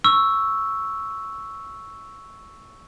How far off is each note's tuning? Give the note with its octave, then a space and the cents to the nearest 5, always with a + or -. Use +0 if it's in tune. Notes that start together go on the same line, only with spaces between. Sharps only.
C#6 +0 E6 +0